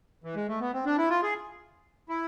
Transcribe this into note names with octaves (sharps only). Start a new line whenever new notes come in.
E3
G#3
A3
B3
C4
D4
E4
F4
G#4
E4